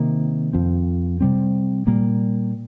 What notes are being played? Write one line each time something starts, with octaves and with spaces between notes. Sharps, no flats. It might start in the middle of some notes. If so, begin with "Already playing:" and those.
Already playing: C3 D#3 A#3
F2 F3 C4
C3 G3 C4
A#2 G3 A#3